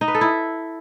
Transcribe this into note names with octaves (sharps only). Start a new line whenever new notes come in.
D#4
B4
A4
E4